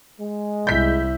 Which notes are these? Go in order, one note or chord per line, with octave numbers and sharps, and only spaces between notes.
G#3
C2 E4 G6 B6